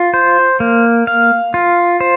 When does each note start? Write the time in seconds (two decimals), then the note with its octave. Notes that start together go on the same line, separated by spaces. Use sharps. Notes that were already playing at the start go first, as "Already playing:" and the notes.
Already playing: F4
0.14 C5
0.60 A#3
1.07 F5
1.54 F4
2.00 C5